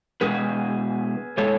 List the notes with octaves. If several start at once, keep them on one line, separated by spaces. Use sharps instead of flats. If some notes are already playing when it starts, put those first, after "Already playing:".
B2 G#3 G#4 B4
B2 G#3 A4 C#5